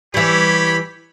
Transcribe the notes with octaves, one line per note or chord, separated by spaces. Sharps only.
E3 G3 G4 C#5 B5